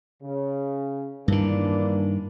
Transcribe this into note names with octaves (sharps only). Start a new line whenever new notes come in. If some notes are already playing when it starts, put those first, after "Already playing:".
C#3
G2 D#3 E3 A#3 D4